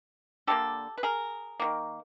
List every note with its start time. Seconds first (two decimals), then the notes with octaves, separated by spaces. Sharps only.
0.47 D3 G3 A#3 G4 A4
0.97 B4
1.03 G#4 A#4
1.60 D#3 F#3 A#3